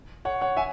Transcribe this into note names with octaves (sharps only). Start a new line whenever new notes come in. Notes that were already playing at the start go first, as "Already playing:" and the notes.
C#5 F#5
C#5 F#5
E5 G#5